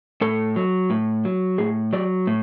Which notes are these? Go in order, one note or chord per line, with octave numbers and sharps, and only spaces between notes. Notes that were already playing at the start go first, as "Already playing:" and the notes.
A2 A4
F#3
A2
F#3
A2 G#4
F#3 D5
A2